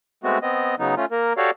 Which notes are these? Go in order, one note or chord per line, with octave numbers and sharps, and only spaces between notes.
G#3 A3 B3 C4 F#4
B3 C4 D#5
C#3 F#3 B3 D#4
A3 C#4 F4
A#3 A#4
F#4 G4 A4 C#5 D5 F5